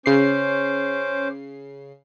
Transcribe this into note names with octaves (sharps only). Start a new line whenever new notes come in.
C#3 C#4 C5 D6 C7